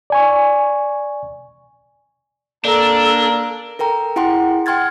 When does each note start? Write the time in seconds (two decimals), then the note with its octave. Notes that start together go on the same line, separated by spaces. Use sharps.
0.10 D5 G#5 C#6
2.65 A#3 D4 A4 A#5
3.79 A4 A#4 G5 A#5
4.16 E4 G#4 F#5 G5 C6
4.66 F#5 G5 C6 F6 G#6 A6